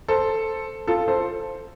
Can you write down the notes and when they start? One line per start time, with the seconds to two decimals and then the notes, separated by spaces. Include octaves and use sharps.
0.08 A4 C5
0.87 F4 A4
1.08 A4 C5